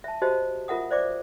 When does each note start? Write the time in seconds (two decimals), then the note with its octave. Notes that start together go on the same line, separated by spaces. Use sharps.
0.04 E5 A5
0.22 F#4 G4 C5 D#5 A5
0.68 F4 A#4 E5 F#5 D#6
0.91 C5 D5 E5 D6